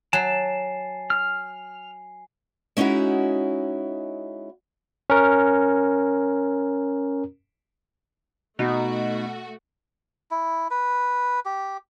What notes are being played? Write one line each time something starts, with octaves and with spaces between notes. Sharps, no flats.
F#3 G#5 A5 C7
F6
G#3 C#4 D#4 E4 F#4
C#4 A#4
B2 A3 D#4 F#4
E4
B4
G4